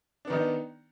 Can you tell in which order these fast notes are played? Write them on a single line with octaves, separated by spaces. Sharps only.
D4 B3 D#3 D#4